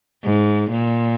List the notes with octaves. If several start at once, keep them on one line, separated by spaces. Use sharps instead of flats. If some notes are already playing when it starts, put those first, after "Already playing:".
G#2
A#2